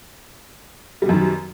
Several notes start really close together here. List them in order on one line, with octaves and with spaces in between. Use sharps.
G3 B2 F#2 D#3